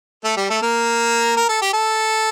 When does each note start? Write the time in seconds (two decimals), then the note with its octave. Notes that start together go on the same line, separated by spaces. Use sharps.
0.24 A3 A4
0.37 G3 G4
0.49 A3 A4
0.62 A#3 A#4
1.37 A#4
1.49 A4
1.62 G4
1.73 A4